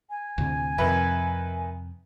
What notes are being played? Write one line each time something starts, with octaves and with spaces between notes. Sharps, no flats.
G#5
D2 A2 C3
F2 C3 D#3 B4 E5